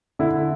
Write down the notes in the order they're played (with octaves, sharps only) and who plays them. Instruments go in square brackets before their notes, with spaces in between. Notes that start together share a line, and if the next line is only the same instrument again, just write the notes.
[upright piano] D3 E4